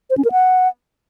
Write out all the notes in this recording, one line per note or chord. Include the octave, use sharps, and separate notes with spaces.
C5
C#4
A#4
F#5